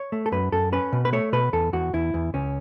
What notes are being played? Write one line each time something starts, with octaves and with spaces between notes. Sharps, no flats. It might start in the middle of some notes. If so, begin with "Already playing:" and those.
Already playing: C#5
A3
A4
F#2 B4
F#2 A4
C#4 B4
B2
B4
A3 C#5
B2 B4
E2 A4
E2 F#4
E2 E4
E2
C#2 C#4